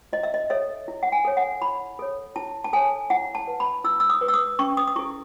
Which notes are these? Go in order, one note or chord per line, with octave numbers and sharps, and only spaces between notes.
E4 D#5
E5
D#5
A4 C#5 E5
E4
F#5
G#5
A4 C#5
F#5
E4 B5
A4 C#5
E4 A5
A5
A4 C#5 G#5
E4 F#5
A5
B4
B5
E4 E6
E6
D#6
B4
E6
D#6
C#4 C#6
D#6
D#6
E4 A4 C#6